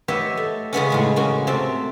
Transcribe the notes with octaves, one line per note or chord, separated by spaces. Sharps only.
B3 G4 B4 C#5 D#5 E5
A3
C#3 G#3 B3 C#4
A2 G#3 G#4
A#3 C#4 F#4
C3 A3 C4